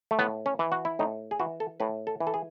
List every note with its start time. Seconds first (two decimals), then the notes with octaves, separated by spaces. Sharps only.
0.11 A3
0.19 A2 B3
0.46 C#4
0.59 E3
0.72 F#4
0.85 E4
0.99 A2 D#4
1.31 G#4
1.40 E3 F#4
1.60 A4
1.80 A2 B4
2.07 A4
2.20 E3
2.27 A4
2.34 G#4